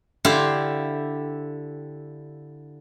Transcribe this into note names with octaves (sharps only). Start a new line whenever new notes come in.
D3 E4 G4 F5 C6